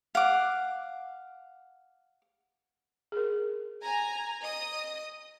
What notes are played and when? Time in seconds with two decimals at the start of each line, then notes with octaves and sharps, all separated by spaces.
0.15 F5 F#5 D6
3.12 G#4 A#4
3.83 G#5 A#5
4.42 D#5 D#6